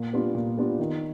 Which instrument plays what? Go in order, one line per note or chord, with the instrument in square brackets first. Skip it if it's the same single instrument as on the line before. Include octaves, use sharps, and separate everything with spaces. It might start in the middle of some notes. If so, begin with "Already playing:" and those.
Already playing: [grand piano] A#2
G3 B3 D4 F4
A#2
G3 B3 D4 F4
D#3